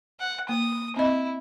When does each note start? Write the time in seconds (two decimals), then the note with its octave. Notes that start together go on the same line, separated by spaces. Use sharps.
0.20 F#5
0.49 A#3 D#6
0.97 C4 E4 D#5